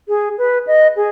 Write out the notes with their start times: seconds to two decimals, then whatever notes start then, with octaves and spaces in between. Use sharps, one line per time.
0.08 G#4
0.38 B4
0.67 D#5
0.96 G#4